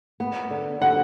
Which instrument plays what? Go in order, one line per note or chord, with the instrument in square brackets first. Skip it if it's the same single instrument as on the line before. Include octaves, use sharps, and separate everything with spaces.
[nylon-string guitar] B3
D3
[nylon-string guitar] D3 [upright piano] F#5